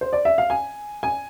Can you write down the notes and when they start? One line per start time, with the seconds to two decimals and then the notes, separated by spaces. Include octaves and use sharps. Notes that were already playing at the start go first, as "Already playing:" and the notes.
0.01 C5
0.13 D5
0.25 E5
0.38 F5
0.50 G#5
1.03 G#5